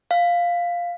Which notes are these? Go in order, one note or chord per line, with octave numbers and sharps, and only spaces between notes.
F5